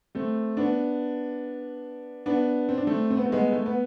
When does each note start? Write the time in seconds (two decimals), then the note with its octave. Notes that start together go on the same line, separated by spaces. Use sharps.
0.15 A3 C4
0.57 B3 D4
2.26 B3 D4
2.69 C4
2.78 D4
2.87 A3 C4
3.10 C4
3.17 B3
3.25 A3
3.32 G#3 B3
3.52 A3
3.66 B3